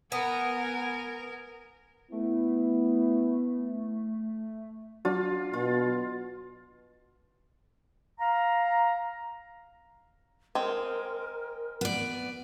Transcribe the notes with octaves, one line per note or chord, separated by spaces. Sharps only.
B3 A#4 F#5 G#5
A3 B3 E4
F#3 D4 F4 F#4
B2 F4
F5 A#5
G#3 C4 A#4
B3 D5